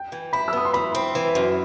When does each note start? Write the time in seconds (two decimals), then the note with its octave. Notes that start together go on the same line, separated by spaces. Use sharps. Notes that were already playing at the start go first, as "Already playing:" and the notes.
Already playing: G5
0.12 E3
0.33 E4 B5
0.48 E6
0.53 B3 D#6
0.65 C6
0.73 E3 B5
0.95 C4
1.15 E3
1.35 F#2